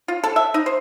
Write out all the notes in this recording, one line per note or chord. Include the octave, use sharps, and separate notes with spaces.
F4
A4
E5
D#4
C5